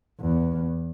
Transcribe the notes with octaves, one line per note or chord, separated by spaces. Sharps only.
E2